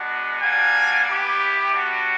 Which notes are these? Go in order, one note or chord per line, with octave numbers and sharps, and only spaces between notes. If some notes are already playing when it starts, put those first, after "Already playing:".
Already playing: G#3 B3 D4 F#4
G3 A#3 D4 F#4 G#5
B3 E4 G4
G3 B3 D4 F#4